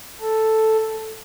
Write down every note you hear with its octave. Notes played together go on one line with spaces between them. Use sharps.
A4